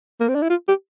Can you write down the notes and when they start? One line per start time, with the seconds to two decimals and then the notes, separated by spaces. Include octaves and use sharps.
0.20 A#3
0.28 C4
0.35 D4
0.42 E4
0.50 F4
0.68 G4